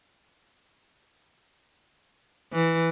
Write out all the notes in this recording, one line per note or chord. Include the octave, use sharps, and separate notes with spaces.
E3